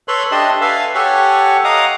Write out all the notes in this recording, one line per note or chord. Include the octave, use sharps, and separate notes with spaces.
A4 B4 C#5 B5 C6
D4 G4 D#5 E5 A5 C6
A4 B4 E5 F5 G#5
G4 A4 C#5 F#5 G#5
D#5 F5 F#5 A#5 D6 D#6